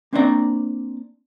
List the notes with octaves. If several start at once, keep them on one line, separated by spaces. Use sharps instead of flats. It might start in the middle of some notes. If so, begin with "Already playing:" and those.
A#3 C4 D4 E4 D5 A#5